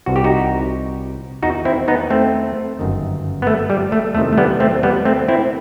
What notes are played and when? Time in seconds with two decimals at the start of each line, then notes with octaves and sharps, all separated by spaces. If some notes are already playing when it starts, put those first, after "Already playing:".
0.06 C2 C3 E3 F#4
0.16 G4
0.24 D#4 F#4
1.43 E2 D#3 D#4 F#4
1.65 C4 E4
1.88 B3 D#4
2.10 A3 C4
2.79 G1 F#2 D#3
3.42 B3
3.47 A3
3.70 G3
3.92 A3
4.15 E2 C3 D#3 A3
4.33 A3
4.38 G3 B3
4.60 A3 C4
4.83 G3 B3
5.05 A3 C4
5.28 C4 E4